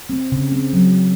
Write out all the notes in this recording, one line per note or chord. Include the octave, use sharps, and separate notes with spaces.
C4
C#3
C4
F#3